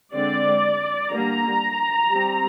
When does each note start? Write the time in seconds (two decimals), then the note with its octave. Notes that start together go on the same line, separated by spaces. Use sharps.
0.13 D3 G#3 C4 D5
1.12 D3 G3 A#3 A#5
2.11 G3 C4